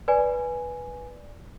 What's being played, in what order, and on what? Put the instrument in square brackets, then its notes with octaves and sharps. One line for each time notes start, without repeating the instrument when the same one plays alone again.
[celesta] B4 D5 G#5